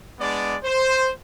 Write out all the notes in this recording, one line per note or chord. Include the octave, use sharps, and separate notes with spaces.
G#3 B3 D4 D5
C5